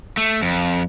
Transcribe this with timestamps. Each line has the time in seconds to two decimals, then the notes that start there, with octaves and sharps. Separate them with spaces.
0.17 A3
0.42 F2